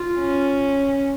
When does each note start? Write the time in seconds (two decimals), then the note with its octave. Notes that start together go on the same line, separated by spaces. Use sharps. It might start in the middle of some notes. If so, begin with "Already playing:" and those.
Already playing: F4
0.19 C#4